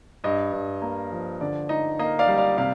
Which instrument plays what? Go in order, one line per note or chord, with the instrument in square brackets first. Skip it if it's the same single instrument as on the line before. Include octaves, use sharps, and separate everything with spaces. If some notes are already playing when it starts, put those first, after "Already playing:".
[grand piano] G2 D#5
G2
A#3
F3
D3 D5
D#4 D#5
A#3 D#5
D5 F5
G3
D5 F5
C3 D5 F5